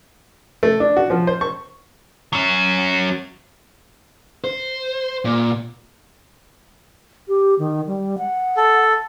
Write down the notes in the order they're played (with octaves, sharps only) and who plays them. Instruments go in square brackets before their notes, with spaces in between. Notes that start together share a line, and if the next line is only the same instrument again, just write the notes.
[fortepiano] A3
D4
F#4
F3
C5
C#6
[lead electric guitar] F#3 C#4
C5
A#2
[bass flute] G4
D#3
G3
F#5
[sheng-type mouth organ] A4